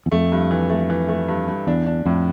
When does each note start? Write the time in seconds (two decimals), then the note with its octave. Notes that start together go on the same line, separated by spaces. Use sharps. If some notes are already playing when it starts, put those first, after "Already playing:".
0.06 E2
0.12 F2 A3
0.32 G2
0.51 E3
0.70 A3
0.90 E3
1.08 A3
1.28 G2
1.48 G2
1.67 E2 D4
1.86 D4
2.05 F2 A2